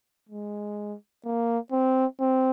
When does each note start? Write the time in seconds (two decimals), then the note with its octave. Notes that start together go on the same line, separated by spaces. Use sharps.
0.29 G#3
1.25 A#3
1.72 C4
2.20 C4